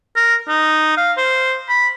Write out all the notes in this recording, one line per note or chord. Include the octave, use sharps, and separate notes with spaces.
A#4
D#4
F5
C5
B5